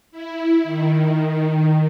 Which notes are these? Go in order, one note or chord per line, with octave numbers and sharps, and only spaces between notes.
E4
D#3